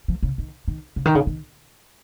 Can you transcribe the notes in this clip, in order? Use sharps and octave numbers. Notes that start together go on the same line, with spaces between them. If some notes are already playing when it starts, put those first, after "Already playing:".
F3
C#3
D#3
D#3
C#3
D#3
C#3
D#3